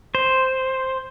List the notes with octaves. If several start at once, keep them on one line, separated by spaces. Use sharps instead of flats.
C5